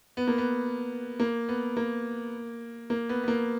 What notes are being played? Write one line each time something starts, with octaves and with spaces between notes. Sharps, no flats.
B3
A#3
B3
A#3
B3
A#3
A#3
B3
B3
A#3